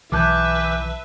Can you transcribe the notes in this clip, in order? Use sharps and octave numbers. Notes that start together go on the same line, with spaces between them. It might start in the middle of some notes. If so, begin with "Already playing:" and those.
B1 E3 B4 E5 A5 D6 F#6 G6